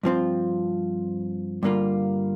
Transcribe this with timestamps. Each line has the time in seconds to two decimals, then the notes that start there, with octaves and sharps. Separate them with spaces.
0.03 G2 F3 C4 F4
1.63 G2 D3 G3 A#3 F4